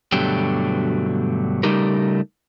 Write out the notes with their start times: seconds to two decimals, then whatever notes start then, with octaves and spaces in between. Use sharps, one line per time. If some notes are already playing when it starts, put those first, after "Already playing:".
0.12 G2 B2 D3 F#3 A3 G4
1.63 C#3 G3 A3 D#4 G4 A#4